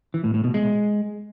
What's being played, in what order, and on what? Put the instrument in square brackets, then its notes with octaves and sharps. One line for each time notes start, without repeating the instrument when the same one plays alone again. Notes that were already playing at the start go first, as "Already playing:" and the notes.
[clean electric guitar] E3
A2
A2
B2
G#3